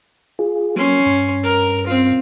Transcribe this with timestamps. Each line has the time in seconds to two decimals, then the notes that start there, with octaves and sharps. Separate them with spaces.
0.39 F4 G#4
0.76 F#3 A#3 C#4 C6
1.06 G2
1.43 A#4
1.87 C4 F4